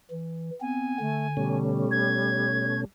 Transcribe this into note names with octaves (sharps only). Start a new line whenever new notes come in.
E3
B3 C4 G#5
D3 A3
B2 G3 A3 C#4
C#5 G#6